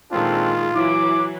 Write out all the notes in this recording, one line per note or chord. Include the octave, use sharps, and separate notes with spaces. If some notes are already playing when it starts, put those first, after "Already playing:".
A#2 D#3 G#3 C4 D4 F4 A4
E3 F#3 E4 D6